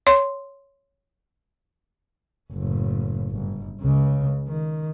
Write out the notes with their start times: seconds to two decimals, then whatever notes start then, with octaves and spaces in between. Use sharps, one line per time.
0.07 C#5 C6
2.52 F#1 A2
3.31 G1
3.81 C#2 C#3
4.48 D#3